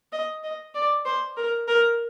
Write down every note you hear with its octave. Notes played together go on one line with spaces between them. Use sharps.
D#5
D#5
D5
C5
A#4
A#4